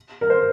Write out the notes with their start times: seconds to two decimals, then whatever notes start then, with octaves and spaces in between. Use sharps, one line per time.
0.21 A#4
0.30 C5